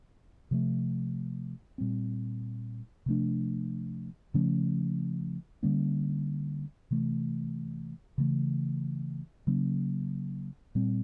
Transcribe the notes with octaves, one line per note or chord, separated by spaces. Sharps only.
C3 F3 A3
A#2 G3 C4
C3 F3 A3 D4
C#3 F3 A3 C#4
D3 G3 A#3 C#4
C3 E3 A3
C#3 E3 A3
C#3 F#3 A#3 C#4
A#2 G3 C4